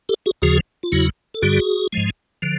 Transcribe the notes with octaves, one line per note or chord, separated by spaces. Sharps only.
G4 A4
F#4 G#4
D#2 C#3 F3 F#4 G#4
F4
E2 C#3 F#3 E4 F#4
A4
G2 D3 G3 F#4 G#4
G#2 F3 G#3
D3 F3